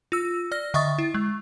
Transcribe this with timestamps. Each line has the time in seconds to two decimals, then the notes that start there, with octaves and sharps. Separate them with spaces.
0.12 F4 E6
0.52 D5 F6 A#6
0.74 D3 D#5 E5 C#6 D#6 A6
0.98 E4
1.14 G#3